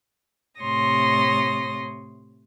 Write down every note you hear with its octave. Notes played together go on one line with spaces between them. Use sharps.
A2 C3 C#5 C6 D#6 A#6